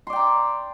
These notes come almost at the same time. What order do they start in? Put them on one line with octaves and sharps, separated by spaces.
C6 D5 G5 A#5